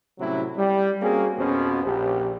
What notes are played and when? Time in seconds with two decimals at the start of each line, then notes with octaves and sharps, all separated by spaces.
0.19 A2 C3 F#3 G3 C#4 E4
0.57 G3
1.01 A#3 C4 C#4 F#4 G#4
1.37 F2 B2 F3 B3 C#4
1.84 A#1 G4